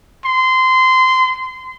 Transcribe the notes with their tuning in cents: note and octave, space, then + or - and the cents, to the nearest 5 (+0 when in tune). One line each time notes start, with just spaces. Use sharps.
C6 -20